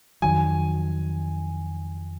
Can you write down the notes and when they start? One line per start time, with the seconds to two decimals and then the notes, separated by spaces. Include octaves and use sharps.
0.22 F2 D#3 F#3 G#5